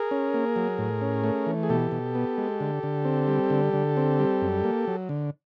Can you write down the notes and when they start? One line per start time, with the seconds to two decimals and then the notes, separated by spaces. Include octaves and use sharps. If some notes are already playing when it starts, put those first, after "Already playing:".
Already playing: G#4 A#4
0.11 C#4
0.34 A#3
0.56 F#3
0.78 A2
1.01 C#4
1.24 A3
1.46 E3
1.63 G#4
1.69 B2 G4 A4
1.92 B2
2.15 B3
2.38 G#3
2.60 D3
2.83 D3
3.05 C4
3.28 G3
3.50 D3
3.73 D3
3.97 C4
4.19 G3
4.41 F#2
4.64 A#3
4.87 F#3
5.09 D3